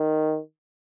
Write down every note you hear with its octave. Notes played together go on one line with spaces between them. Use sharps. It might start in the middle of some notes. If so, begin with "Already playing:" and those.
Already playing: D#3